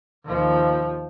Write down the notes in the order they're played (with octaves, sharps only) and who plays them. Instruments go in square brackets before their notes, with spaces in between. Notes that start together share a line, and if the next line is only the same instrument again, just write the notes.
[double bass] D#2 F3